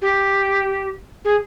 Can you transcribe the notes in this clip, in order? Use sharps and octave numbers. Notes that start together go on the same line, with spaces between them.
G4
G#4